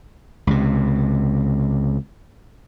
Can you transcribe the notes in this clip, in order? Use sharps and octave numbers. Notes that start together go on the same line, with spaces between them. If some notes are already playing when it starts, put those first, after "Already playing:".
C#2 C3